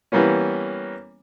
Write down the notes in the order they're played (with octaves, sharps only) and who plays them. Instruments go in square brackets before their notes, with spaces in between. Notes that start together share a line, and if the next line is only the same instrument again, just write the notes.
[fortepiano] E3 G3 A#3 B3 C#4